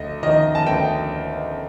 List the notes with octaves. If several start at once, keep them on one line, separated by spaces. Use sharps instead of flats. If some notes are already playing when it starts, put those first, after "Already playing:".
Already playing: D2 D#5
D#3 D#5
A5
D2 G5